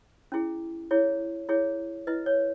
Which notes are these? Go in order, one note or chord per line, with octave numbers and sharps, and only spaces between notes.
C#4 E4 G#4
E4 G#4 C#5
E4 G#4 C#5
E4 B4 D#5
C#5